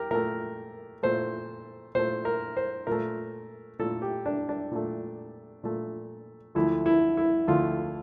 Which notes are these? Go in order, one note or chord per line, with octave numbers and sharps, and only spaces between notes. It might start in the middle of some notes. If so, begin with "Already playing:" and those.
Already playing: G4 A#4
A#2 A3 A#4
A#2 A3 C5
A#2 A3 C5
A#4
C5
A#2 A3 A#4
A#2 A3 A4
G4
D4
D4
A#2 A3
A#2 A3
D2 D3 F3 A3 E4
E4
E4
D2 D3 F3 A3 F4